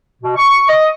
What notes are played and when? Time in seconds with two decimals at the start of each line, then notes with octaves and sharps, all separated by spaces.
0.22 B2
0.36 C#6
0.68 D#5